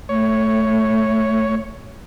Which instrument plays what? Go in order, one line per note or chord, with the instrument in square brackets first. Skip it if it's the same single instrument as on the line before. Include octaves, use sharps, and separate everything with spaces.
[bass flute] A3 [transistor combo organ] C#5